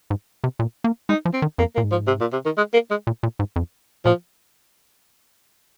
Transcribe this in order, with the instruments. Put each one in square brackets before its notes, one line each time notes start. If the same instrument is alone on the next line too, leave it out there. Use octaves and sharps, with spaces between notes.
[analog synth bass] G#2
C3
A#2
A#3
[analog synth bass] G#3 [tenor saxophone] D#4
[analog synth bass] F3
[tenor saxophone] C4
[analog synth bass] D#3
[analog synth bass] F2 [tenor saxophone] A#3
[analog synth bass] A#2 [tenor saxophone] A#3
[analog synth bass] G#2
[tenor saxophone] F3
C3
A#2
C3
D#3
G#3
A#3
G#3
[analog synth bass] A#2
A#2
G#2
F2
[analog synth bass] A#2 [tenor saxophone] F3